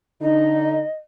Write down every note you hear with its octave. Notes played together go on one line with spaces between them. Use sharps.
D3 D#4 D#5